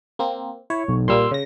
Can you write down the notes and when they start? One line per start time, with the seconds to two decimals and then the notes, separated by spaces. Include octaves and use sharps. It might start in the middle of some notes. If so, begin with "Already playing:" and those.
0.19 A#3 C4
0.70 E4 C#5
0.88 B1
1.08 A#2 G3 A#3 C6 E6
1.31 C#3 A#6